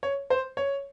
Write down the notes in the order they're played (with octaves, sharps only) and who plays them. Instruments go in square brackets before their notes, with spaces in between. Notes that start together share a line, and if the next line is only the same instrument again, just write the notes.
[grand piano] C#5
C5
C#5